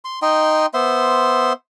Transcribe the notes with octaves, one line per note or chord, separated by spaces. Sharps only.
C6
D#4 D#5 G5 C6
B3 C5 E5 C6